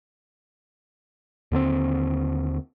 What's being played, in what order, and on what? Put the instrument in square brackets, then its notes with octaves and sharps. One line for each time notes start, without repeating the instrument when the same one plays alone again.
[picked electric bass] D#2 D3 G#3 C4